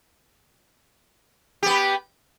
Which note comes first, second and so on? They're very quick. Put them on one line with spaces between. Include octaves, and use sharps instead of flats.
G4 B3 B4